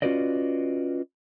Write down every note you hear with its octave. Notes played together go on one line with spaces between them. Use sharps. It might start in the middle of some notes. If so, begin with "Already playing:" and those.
C#4 F4 F#4 B4 D5 D#5